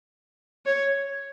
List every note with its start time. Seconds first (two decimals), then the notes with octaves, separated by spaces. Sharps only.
0.66 C#5